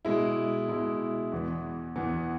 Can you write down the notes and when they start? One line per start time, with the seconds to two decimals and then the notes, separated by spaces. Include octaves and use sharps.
0.05 B2 G#3 E4
0.68 B2 G#3 E4
1.32 E2 E3 B3
1.96 E2 E3 B3